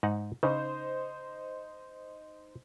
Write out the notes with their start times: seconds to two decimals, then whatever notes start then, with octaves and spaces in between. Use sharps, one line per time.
0.03 G#2 D#4 F#5
0.43 C#3 D#4 C5